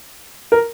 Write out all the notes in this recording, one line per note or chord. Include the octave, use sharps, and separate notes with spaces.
A#4